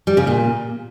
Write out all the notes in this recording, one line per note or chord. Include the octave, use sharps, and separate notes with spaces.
G3
C#3
A#2